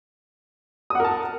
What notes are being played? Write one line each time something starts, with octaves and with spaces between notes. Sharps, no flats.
A#4 F#5 A5 D#6